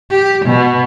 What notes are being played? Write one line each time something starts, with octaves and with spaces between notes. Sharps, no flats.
G4
B2